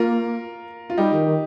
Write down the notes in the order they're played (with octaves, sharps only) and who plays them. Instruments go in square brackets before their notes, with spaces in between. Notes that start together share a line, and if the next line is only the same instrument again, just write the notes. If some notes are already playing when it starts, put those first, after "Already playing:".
Already playing: [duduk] A#3 [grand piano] F4 A#4
[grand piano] F4
[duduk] G3 [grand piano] D#4 G4
[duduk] D#3
D#3